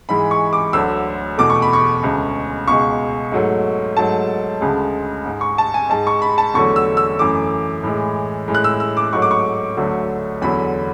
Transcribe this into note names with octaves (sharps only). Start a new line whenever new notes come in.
G#2 E3 G#3 B5
C#6
D6
D2 D3 F#3 E6
E2 B2 A3 D6
C#6
B5
C#6
D2 C#3 G#3
C#2 B2 G#3 C#6
G#2 F#3 A3
G#2 F#3 A3 A5
D2 C#3 G#3
G#2 G#3
C#6
A5
G#5
G#2 G#3 A5
C#6
B5
A5
E2 D3 F#3 A3 C#6
E6
E6
F#2 E3 A3 D6
A2 E3 G#3
A2 G#3
F#6
E6
E6
D6
G#2 F#3 A3 C#6
D6
C#6
D2 D3 F#3 A3
E2 D3 F#3 B5